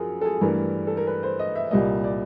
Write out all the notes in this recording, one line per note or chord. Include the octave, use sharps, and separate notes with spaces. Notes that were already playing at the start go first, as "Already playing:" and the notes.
Already playing: F#2 F3 G#4 A#4
A4
G#4
G2 E3 A3 A#4
A4
A#4
B4
C5
D#5
E5
C2 A#2 G3 A#3 D#5
D5